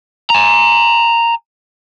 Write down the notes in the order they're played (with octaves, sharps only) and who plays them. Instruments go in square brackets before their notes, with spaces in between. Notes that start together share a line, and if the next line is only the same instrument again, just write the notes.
[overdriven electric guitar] G#5 A#5